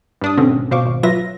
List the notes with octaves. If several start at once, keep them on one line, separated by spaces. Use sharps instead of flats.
G2 D4 D#6
B2 D3 C4 C#4
G#1
B2 C5 F5 C#6 D6
G#1
F#3 F4 B4 E5 A#6